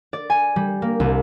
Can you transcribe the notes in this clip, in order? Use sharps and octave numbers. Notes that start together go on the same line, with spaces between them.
D5
G#5
G3
A#3
C2